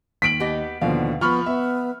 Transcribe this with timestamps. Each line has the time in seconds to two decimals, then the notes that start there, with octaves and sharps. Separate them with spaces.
0.22 D#2 B6 D7 F#7
0.40 B3 G4 D#5
0.81 D#2 B2 D3 F3 F5
1.21 F3 B3 B5 C#6 F6
1.46 B3 E5